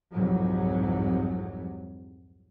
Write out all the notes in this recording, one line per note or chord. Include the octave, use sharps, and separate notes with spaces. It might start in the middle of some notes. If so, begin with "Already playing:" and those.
C2 F2 G#2 F#3